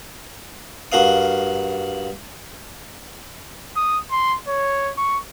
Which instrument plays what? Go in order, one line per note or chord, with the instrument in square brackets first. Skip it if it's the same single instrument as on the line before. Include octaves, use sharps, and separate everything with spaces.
[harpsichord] G2 F#4 A#4 F5 D#6
[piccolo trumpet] D#6
C6
C#5
C#6